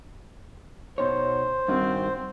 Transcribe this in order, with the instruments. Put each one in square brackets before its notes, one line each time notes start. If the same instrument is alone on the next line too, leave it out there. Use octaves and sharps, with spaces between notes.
[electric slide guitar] B2 D#4 C#5 [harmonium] C5
[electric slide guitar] G2 D#3 F#4 [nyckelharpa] C4